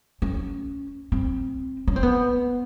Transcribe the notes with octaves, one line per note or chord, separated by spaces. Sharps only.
C#4
C4
C#4
C4
B3